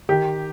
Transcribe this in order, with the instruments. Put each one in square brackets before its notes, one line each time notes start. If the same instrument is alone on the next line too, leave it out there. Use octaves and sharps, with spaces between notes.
[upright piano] D#3 G4